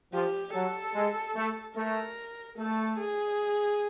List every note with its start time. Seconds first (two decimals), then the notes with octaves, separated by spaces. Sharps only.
0.13 F3 G4
0.53 F#3 A4
0.95 G#3
1.36 A3
1.76 A3 A#4
2.58 A3 A4
2.99 G#4